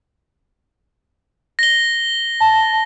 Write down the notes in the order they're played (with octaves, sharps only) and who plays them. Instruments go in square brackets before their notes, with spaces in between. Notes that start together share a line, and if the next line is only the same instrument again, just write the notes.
[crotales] A#6 G7
[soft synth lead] A5